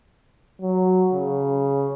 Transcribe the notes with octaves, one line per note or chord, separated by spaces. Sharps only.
F#3
C#3